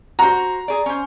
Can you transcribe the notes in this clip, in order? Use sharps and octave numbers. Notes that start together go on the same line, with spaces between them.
F#4 C5 A#5
G#4 D5
C#4 C5